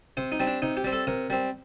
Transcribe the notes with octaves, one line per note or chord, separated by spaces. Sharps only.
C3 C5
D#4
G3 C4
D4
C3 D#4
G4
G3 C4
A4
C3 A#4
G3 C4